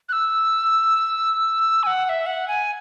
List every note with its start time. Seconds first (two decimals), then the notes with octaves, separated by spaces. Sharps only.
0.09 F#6
0.13 E6
1.83 G#5
1.87 F#5
2.05 F#5
2.09 E5
2.26 F#5
2.48 G#5